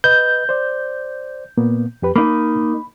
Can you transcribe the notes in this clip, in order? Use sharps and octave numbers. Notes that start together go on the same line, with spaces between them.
B4 D#5 G6
C5 D5
A#2 A#3 B3
F2 G4 B4
A#3 D#4 B5